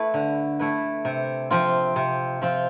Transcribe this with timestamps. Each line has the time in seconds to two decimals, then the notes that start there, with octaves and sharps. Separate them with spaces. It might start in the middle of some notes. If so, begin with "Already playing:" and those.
Already playing: A3 E4 B4
0.14 D3
0.60 A3 E4 B4
1.05 C3
1.51 F3 C4 F4
1.96 C3
2.42 F3 C4 F4